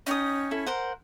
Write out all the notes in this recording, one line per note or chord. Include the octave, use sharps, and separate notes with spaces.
C#4 D#4 G5 D#6
E4 A4
A#4 C5 F#5